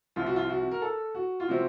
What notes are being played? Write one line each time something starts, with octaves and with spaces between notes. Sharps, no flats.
C2 C3 F3 F4
F#4
F4
F#4
A#4
A4
F#4
F4
C3 F3 C4 F#4